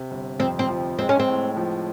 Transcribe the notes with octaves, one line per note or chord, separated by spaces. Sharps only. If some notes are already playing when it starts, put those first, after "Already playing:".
Already playing: C3
G1
F2 C4
C4
F3
G#3 C4
C#4
C4
A2
F3